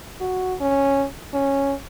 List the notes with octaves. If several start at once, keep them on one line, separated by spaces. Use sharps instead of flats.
F#4
C#4
C#4